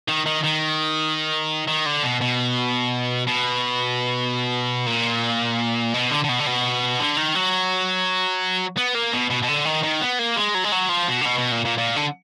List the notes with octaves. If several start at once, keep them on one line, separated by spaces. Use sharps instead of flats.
D#3
D#3
D#3
D#3
D3
B2
B2
B2
A#2
B2
D3
D3
B2
D3
B2
D3
D#3
F#3
B3
A#3
B2
B2
B2
D3
D#3
D#3
B3
A#3
G#3
F#3
G#3
F#3
F3
B2
D3
B2
B2
A#2
A#2
A#2
D3